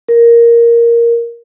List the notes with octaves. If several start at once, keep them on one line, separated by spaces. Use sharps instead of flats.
A#4